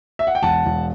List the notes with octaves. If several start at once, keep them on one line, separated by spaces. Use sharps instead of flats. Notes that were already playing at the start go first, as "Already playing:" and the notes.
E5
F#5
G5
E1 F#5 A5
E1